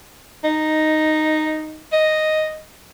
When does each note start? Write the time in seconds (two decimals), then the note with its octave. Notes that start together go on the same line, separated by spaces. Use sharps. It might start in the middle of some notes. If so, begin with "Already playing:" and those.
0.44 D#4
1.93 D#5